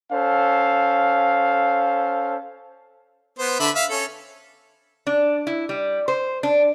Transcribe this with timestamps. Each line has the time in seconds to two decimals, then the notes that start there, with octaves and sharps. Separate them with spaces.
0.13 C#4 A4 C5 F5
3.39 B3 C5
3.60 D3 E5 B5
3.76 E5 F5
3.90 C#4 A4
5.07 D4
5.47 E4
5.69 G3
6.08 C5
6.43 D4